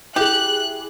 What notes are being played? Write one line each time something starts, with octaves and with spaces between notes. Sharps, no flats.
E4 G4 G#4 F#6